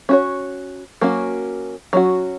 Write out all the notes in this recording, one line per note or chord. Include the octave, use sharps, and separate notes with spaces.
C#4 F#4 C#5
F#3 A#3 C#4 F#4
F#3 C#4 F#4